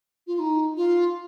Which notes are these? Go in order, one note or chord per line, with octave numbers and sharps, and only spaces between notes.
F4
D#4
F4